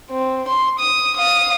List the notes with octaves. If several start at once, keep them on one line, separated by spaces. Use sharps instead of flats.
C4
C6
D#6
F5 D#6